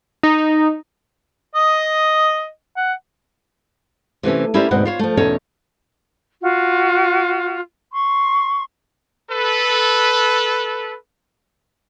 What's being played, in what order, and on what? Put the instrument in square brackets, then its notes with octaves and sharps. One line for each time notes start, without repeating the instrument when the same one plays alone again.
[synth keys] D#4
[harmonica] D#5 [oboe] D#6
[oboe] F#5
[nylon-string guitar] C3 E3 A3 C#4
C#4 E4 G4 A#4 C5 D5
D2 G#2 B2 C4 F#5
F4 C5 C#5
F3 A3
E2 B2 C#4 D#4 A4 C#5
[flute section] F4 F#4
C6 C#6
[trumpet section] A4 B4